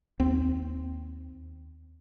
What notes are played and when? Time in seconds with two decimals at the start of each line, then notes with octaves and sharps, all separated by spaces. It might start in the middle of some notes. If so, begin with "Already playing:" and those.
0.20 D#2 C4